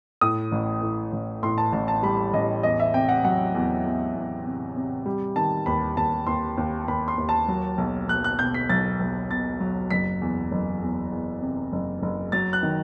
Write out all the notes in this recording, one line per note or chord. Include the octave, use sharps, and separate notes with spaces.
A2 D#6
A1
A2
A1
A2 C6
A5
A1 A5
A5
G3 B5
A1 D#5
E2 D#5
E5
C3 G5
F#5
F#3 F#5
E2
E2
E2
C3
C3
G3
D#3 A5
D#2 B5
D#2 A5
D#2 C6
D#2
D#2 B5
C6
D#2
A5
F#3
B1
B1 F#6
F#6
B2 G6
B6
B1 A6
B1
B2 A6
F#3
F#1 B6
E2
F#1
E2
E2
C3
F#1
F#1
F#3 A6
F#6
D#3